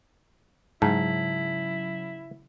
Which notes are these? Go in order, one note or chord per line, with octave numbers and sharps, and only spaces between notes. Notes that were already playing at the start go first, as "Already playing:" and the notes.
G#2 C#3 F#3 E4 A5